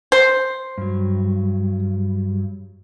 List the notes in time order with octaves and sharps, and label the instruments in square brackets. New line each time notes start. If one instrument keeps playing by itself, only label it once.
[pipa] C5
[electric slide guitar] G2 F#3